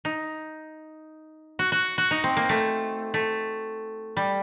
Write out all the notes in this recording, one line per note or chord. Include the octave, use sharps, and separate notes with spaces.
D#4
F#4
F#4
F#4
D#4
C4
A#3
A3
A3
G3